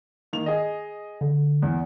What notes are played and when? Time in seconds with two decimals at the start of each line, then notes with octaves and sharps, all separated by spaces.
0.33 D#3 A#3 F7
0.46 G#4 D#5
1.21 D3
1.62 E2